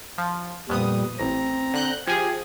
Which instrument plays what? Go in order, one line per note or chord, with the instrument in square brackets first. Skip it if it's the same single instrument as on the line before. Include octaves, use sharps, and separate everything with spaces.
[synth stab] F3
[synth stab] F2 B3 D#6 [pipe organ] A#2 G3
[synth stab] A1 [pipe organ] C4 A#5
[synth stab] D3 F#6 G6
[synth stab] F3 G#4 [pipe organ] G4 G#5